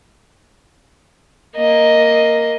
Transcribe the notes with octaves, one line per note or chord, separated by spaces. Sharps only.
A#3 D#5